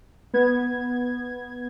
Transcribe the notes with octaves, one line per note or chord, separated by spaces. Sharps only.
B3 G#6